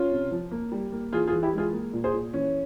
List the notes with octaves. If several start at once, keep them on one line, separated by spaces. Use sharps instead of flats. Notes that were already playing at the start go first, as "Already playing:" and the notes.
Already playing: C#4 F4
C3
F3
A#3
G3
A#3
E3 F4 G#4
F4 G#4
E3
E4 G4
G#3
F4 G#4
A#3
A#2
G#4 C5
A#2
E3 C#4